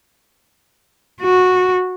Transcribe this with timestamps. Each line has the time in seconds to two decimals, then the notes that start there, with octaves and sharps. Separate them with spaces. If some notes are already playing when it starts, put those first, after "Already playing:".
1.22 F#4